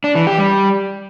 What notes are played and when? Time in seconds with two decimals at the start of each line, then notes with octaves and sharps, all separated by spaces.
0.04 D4
0.15 E3
0.27 G4
0.38 G3